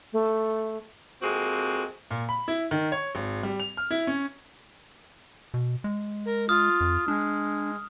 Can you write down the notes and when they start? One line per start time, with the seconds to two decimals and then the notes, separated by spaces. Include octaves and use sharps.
0.13 A3
1.22 F2 G#3 A#3 C4 F#4
2.11 A#2
2.29 B5
2.48 E4
2.71 D#3
2.92 C#5
3.15 G#1
3.43 G3
3.60 F7
3.77 F6
3.91 E4
4.07 C#4
5.54 B2
5.84 G#3
6.26 A#4
6.49 F4 D#6 F6
6.81 F2
7.08 G#3 D4